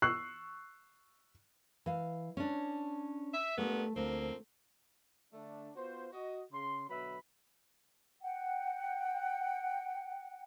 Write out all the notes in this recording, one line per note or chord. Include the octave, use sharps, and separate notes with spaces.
C#6 E6 F#6 C7
E3 F5
C#4 D4
E5
G2 A#2 A3 B3
D2 F3 A#3 C4
D3 A3 D4
B3 F4 F#4 C5
F#4 D#5
C#3 C6
B2 D3 F#3 B4 E5 B5
F#5 G5